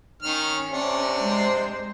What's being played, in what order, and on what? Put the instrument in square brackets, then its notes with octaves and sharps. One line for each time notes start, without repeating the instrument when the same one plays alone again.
[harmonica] D#3 F6 [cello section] C#4
[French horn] C3 [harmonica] D4
[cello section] G#3 C5